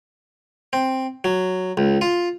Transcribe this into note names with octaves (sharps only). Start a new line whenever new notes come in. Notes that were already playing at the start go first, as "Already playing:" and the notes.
C4
F#3
C#2
F4